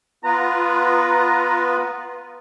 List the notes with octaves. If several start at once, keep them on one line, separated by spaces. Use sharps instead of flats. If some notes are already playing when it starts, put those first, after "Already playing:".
B3 F4 B4 A#5